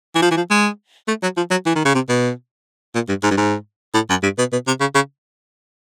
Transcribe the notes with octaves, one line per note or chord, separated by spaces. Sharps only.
E3
F3
E3
F3
G#3
A3
F#3
F3
F#3
E3
D#3
C#3
C3
B2
A#2
G2
G#2
G2
G#2
A2
F#2
G2
B2
B2
C3
C#3
C#3